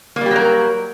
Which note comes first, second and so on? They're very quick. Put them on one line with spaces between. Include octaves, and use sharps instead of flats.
A#3 G3 G4 F#3 A#4